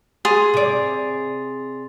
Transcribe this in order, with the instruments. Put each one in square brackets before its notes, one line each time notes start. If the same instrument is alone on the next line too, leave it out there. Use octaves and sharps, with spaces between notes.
[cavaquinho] G#4 [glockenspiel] C6 A6 F7
[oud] C3 D5